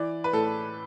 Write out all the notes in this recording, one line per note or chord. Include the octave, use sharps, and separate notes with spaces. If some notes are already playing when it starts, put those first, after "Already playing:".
Already playing: E3 D5
B4
A2 A4